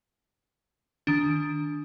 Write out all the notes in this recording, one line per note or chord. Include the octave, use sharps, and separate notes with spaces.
D#3 D4